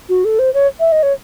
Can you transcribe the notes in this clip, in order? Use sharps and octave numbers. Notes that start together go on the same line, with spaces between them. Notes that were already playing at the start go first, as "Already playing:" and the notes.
F#4
A4
C5
C#5
E5
D#5
C#5